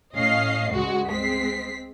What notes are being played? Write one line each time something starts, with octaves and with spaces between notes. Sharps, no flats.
A2 C#4 D#5 F5 C7
C#2 G2 G#3 F#4
G#3 C4 B6 C7